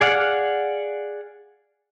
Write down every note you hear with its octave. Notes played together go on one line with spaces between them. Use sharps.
G#4 D5 F5 F#5